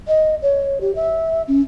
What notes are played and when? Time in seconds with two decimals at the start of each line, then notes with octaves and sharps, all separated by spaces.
0.08 D#5
0.42 C#5
0.81 G4
0.96 E5
1.48 C#4